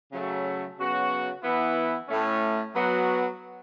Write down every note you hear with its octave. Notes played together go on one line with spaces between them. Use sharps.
C#3 F#3 A3
C#3 F#3 B3 F#4
E3 B3 E4
A2 A3 C#4
F#3 B3 F#4